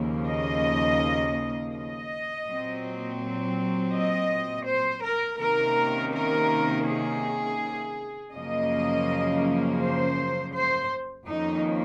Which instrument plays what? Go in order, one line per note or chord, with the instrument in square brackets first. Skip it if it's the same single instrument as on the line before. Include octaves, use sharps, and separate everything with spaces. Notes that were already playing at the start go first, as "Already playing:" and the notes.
Already playing: [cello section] D#2 C#3 F3 A#3
D#5
D#5
A#2 F#3 C4
D#5
C5
A#4
C3 D#3 A#3 C#4 A#4
A#4
G#4
F#2 C#3 F3 A#3 D#5
C5
C5
F2 D#3 A#3 C#4 D#4